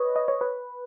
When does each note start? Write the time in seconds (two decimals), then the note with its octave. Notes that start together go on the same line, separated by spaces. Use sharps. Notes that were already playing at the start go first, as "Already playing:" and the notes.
Already playing: B4 C#5 D#5
0.16 D#5
0.28 C#5
0.41 B4